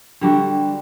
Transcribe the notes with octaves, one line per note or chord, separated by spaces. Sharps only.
D3 G3 D4 F#4